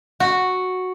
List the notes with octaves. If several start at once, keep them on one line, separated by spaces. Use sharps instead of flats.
F#4